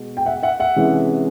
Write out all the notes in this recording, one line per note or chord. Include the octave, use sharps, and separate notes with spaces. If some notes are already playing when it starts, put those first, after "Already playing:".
Already playing: B2 G#3
G5
E5 F#5
E5 F#5
E5 F#5
C3 E3 G#3 C#4